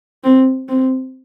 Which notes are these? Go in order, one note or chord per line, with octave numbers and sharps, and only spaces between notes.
C4
C4